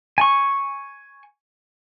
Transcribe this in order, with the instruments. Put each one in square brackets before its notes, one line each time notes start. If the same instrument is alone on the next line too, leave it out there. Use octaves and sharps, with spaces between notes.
[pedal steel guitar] G#5 C#6